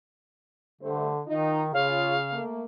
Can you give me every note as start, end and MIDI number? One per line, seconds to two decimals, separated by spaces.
0.81 1.11 43
0.81 1.21 50
0.81 1.11 57
0.81 1.11 72
1.27 1.69 51
1.27 1.63 63
1.27 1.63 65
1.74 2.40 49
1.74 2.16 65
1.74 2.16 68
1.74 2.16 73
1.74 2.43 77
2.32 2.62 57
2.32 2.62 58